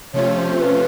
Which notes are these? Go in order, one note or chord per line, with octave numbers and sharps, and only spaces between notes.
C3 F3 A3 C#4 F4 C#5
C5
B4